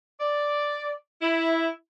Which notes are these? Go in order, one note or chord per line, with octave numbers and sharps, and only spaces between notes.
D5
E4